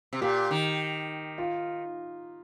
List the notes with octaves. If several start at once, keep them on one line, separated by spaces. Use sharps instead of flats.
C3
A#2 G4
D#3
F4